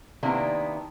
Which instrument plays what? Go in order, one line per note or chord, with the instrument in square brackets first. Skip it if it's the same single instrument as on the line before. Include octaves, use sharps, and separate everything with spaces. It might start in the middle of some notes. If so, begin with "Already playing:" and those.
[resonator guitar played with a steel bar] C3 D#3 A#3 B3 D4 E4